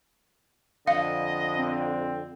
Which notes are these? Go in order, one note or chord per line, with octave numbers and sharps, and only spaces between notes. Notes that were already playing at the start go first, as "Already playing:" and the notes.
F2 D3 D#5 F5
C4